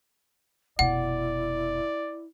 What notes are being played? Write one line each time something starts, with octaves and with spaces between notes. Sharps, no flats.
F1 B2 E4 D5 F#5